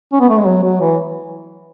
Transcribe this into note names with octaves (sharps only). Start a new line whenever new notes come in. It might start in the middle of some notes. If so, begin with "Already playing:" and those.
C#4
B3
A3
G#3
F#3
F#3
E3